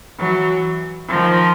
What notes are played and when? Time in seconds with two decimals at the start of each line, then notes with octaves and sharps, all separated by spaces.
0.18 E3 F#3
1.09 D#3 F3